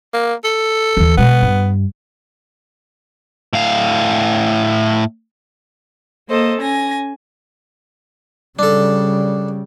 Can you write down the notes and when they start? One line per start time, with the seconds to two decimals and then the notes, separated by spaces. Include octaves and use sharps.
0.13 A#3
0.44 A4
0.97 D#2 E3
1.17 B2 G#3 B3
1.42 G2
3.53 A2 F5
6.29 A#3 A4 C5 D#5
6.59 C#4 G#5 A#6
8.59 C#3 G3 D4 A4